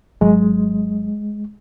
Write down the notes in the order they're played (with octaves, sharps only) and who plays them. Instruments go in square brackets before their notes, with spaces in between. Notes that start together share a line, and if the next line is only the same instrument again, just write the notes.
[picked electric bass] G#1 F#3 [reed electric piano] G#3